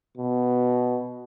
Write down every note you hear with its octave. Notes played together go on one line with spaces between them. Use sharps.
B2